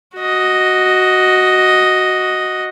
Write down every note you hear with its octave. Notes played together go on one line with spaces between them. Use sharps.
F#4 D#5